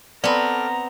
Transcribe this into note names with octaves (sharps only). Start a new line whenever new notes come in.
B3 C4 A4 D5 A#5 B5 D6 F6